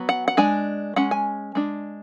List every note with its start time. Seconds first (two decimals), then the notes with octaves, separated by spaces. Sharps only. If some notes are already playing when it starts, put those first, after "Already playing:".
Already playing: F#3 B3
0.09 F#5
0.28 F#5
0.37 G#3 D4 G#5
0.96 G#3 C#4 F#5
1.11 G#5
1.55 G#3 D4